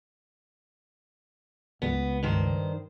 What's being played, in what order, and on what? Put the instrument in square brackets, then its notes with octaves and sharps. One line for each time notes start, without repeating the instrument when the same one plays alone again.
[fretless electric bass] C#2 [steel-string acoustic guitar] B3
[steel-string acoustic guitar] G2 D#3 C5